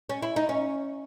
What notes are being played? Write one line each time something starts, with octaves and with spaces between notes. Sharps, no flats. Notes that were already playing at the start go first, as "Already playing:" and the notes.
C#4
E4
D#4
C#4